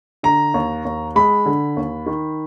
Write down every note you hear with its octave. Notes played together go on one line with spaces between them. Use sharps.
D3 A#5
D#2
D#2
G#3 B5
D3
D#2
D#3